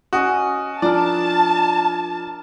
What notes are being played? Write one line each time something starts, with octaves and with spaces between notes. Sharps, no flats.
C#4 F#4 D#5
F3 D4 A#4 D5 A5